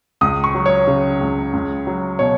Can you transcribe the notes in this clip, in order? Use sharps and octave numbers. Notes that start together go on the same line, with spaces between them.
C#2 D#6
C#6
F#3
C#5
C#3
C#2
C#2
F#3
B2 C#5